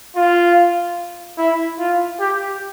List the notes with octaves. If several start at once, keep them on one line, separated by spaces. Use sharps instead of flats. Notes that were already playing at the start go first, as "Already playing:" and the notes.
F4
E4
F4
G4